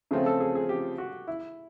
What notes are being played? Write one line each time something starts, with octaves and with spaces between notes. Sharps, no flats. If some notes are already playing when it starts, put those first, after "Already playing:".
C#3 F3 A3 C4 F4 G#4
A4
G#4
G#4
G4
F#4
E4